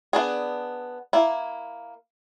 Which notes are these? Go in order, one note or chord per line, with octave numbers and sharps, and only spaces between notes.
B3 D4 G#4
A#3 E4